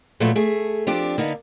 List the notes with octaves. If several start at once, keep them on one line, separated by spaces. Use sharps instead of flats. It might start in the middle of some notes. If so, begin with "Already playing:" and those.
A#2 F3 F#3 A3 B3
A3 G#4
F3 C4 D4 G4
D3 A#3 B3 D#4